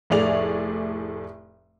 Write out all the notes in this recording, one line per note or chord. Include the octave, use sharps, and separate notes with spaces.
F1 A2 A3 G#4 D5 F7